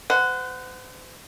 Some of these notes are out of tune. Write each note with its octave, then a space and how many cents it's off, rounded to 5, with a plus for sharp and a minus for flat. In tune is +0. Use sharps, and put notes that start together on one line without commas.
C5 -40 F#5 +0